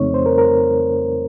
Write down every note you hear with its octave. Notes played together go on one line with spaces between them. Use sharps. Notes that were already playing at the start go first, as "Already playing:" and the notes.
Already playing: F2 C#3 A3 C4 D#4 C#5
C5
A#4
A#4